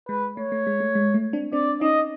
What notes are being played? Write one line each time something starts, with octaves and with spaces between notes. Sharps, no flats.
G#3 B4
A3 C#5
A3
G#3
A3
G#3
A3
C4 D4
C4 D4 D5
C#4 D#4 D#5